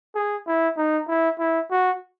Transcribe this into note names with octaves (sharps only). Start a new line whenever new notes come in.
G#4
E4
D#4
E4
E4
F#4